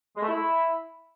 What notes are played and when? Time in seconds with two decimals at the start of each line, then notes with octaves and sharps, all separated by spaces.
0.17 G#3
0.23 A3
0.29 E4